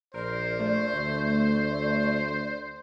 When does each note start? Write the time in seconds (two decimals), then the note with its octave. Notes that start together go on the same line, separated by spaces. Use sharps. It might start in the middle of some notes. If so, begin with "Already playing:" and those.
0.14 A#1 A#4 C5 D5
0.60 A3
0.94 D2 D5